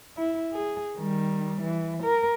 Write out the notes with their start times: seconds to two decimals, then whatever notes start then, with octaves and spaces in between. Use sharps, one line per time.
0.17 E4
0.53 G#4
0.98 D#3 G3
1.62 E3
2.03 A#4